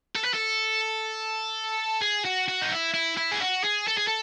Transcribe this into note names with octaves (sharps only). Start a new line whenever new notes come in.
A4
B4
A4
G#4
F#4
F#4
D#4
E4
E4
E4
G#4
F#4
G#4
A4
G#4
A4